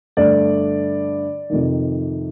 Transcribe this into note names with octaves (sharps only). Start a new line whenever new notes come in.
G2 D3 A3 D5
F2 C3 D#3